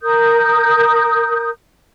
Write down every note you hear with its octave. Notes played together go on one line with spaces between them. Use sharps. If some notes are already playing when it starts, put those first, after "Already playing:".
A#4 D#6 G6